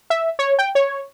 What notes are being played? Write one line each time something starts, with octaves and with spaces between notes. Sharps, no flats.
E5
C#5
G5
C#5